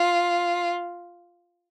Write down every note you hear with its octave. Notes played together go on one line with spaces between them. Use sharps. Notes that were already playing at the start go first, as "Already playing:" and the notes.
Already playing: F4